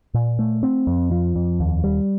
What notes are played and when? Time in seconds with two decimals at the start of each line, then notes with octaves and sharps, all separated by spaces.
0.14 A#2
0.39 A3
0.63 C4
0.87 F2
1.11 F3
1.36 F2
1.60 D#2
1.84 G3